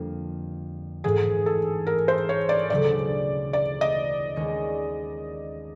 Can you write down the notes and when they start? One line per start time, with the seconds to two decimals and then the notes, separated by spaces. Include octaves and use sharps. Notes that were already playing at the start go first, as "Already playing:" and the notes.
Already playing: F2 D3 G3 A#3
1.04 A1 G#2 E3 G#4
1.46 A4
1.87 A#4
2.08 C5
2.29 C#5
2.49 D5
2.70 E1 D2 C#3 F#3 A3 D5
3.53 D5
3.81 D#5
4.36 D#2 D#3 G#3 C#4